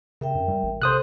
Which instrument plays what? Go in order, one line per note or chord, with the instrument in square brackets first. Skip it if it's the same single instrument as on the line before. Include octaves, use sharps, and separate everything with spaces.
[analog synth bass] C#3 [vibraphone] A#4 E5 G5
[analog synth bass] F#2
G3
A1
[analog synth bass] C3 [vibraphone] A4 [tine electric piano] C5 D#6 F#6